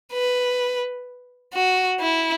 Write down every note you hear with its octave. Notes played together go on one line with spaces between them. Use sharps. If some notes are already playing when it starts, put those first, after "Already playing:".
B4
F#4
E4